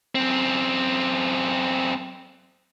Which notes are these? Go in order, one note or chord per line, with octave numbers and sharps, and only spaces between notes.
F#2 C4